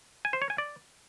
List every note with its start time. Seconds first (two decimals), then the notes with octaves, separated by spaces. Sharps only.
0.25 G#5
0.33 C5
0.42 C#5
0.50 G#5
0.58 D5